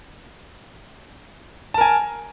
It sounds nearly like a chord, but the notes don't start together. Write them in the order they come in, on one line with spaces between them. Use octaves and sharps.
A5 A#4 G#5